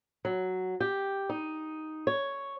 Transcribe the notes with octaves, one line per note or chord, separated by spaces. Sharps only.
F#3
G4
D#4
C#5